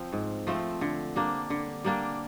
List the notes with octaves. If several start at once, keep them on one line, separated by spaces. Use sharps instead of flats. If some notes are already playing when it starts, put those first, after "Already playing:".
Already playing: F3 C4
G#2
F3 A3 C4
D3
G3 A#3 D4
D3
G3 A#3 D4